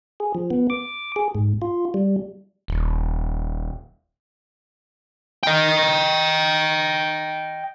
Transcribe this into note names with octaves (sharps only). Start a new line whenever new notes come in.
G#4
F3
B3
D6
G#4
G#2
F4
G3
D#1
D#5 G5